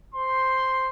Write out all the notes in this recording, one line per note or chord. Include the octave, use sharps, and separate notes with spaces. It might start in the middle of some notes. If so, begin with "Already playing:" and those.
C5 C6